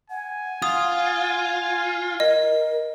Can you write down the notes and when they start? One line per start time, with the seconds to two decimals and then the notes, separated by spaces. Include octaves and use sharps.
0.10 F#5 G#5
0.62 F4 D#6
2.20 A#4 D#5